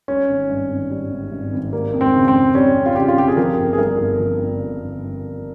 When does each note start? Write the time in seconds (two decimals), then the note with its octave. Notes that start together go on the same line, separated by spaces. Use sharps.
0.08 G3 C#4
0.29 G#1
0.50 G2
0.71 G#1
0.91 G3
1.11 G#1
1.32 G2
1.53 G#1
1.73 G3 A#3
1.93 F2
2.01 C4
2.14 C#3
2.28 C4
2.35 F2
2.55 G3 C#4
2.76 F2
2.86 F4
2.96 C#3 G4
3.08 F4
3.17 F2 G4
3.28 G#4
3.37 F3 A#4
3.58 G1
3.73 G#4
3.78 G2 A#4
3.99 G1
4.20 F3
4.40 G1
4.60 G2
4.81 G1